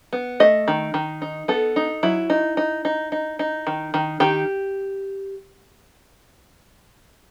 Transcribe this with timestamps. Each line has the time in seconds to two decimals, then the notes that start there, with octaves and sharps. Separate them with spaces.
0.13 B3
0.40 A3 D#5
0.68 D#3
0.94 D#3
1.22 D#4
1.48 B3 A4
1.76 D#4
2.03 F#3 E4
2.30 D#4
2.57 D#4
2.85 D#4
3.12 D#4
3.39 D#4
3.67 D#3
3.94 D#3
4.20 D#3 G4